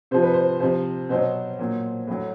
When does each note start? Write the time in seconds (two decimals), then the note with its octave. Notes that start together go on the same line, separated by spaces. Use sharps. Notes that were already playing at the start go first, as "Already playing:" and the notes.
0.11 C3 F3 C5
0.23 B4
0.34 C5
0.60 C3 F3 C5
1.09 B2 F#3 C5
1.59 A#2 F#3
2.07 A2 F#3